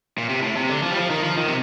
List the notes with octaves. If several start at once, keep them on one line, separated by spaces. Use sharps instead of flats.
A#2
C3
A2
C3
D3
F3
G3
F3
D#3
F3
D#3
C3